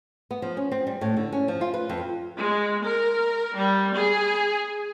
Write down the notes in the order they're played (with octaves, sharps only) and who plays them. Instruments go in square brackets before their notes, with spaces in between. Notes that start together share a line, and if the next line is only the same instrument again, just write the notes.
[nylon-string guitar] B3
F3
C#4
C4
G3
A2
D3
C#4
F3
F4
B4
F2
[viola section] G#3
A#4
G3
G#4